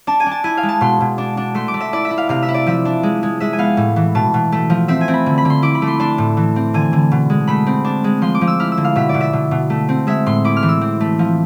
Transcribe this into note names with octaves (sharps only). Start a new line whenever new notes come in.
D4 A5
G#5
D4
A5
E4 G#5
F5
G#3
A5
B2 C6
B2
D4
D4
A3 C6
D6
A3
E5
E4 D5
E5
E4
F5
C3 F5
E5
E4
D5
F3 E5
D4
G#3
G#3
G#3 E5
G#5
B3 F5
A2
E3
B2 A5
B2
A3
F3
C4 E5
G#5
C4
B5
D3
B5
D3 C6
E4 D6
B5
A3
C6
D4 C6
A2
E3
C4
D3 G#5
D3
B2
G#3
A3 B5
C4
D4
G#3
F3 C6
D6
F3
E6
E4 F6
E6
D3
F5
B2 E5
D5
B2
E5
B2
B2
A3
C4
G#3 E5
A2 C6
E4 D6
F6
E3
E6
C4
A3
F3